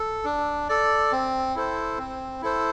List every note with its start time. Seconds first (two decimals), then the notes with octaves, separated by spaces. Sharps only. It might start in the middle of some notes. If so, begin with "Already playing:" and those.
Already playing: A4
0.24 D4
0.69 A4 D5
1.12 C4
1.55 E4 A4 C5
1.98 C4
2.42 E4 A4 C5